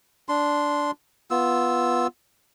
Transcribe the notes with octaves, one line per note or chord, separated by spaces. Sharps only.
D4 C6
B3 F4 E6